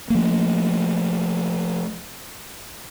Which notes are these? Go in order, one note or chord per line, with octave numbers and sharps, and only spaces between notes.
F3 A3 A#3